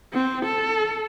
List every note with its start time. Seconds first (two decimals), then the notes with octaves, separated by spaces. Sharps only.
0.13 C4
0.45 A4